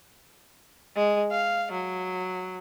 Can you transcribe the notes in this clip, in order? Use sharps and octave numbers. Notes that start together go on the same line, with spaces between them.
G#3
F5
F#3